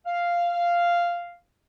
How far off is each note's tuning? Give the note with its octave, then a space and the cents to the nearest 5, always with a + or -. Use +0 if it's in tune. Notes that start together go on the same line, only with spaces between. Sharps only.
F5 -5